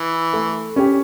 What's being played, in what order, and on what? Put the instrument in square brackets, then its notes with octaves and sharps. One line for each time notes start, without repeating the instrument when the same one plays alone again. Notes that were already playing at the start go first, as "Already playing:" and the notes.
Already playing: [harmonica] E3
[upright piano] A3
C#4 G4